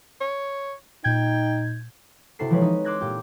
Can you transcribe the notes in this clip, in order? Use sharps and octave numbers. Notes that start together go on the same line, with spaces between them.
C#5
A#2 D#4 G5 G6 G#6
C3 E4 F#4 A4 C7
E3 F3 G#3 C4 B4 C#5
D#4
C6 D6 E6 F#6 G#6 A#6
A#2 G4